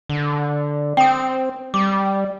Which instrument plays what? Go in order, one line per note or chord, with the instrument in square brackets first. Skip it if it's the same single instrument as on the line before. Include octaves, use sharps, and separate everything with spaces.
[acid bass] D3
[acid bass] C4 [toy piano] G5 D#6
[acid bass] G3 [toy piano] D6